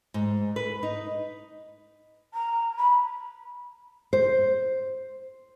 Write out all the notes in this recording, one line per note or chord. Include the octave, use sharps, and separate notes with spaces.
G#2
B4
D#4
A#5
B5
C5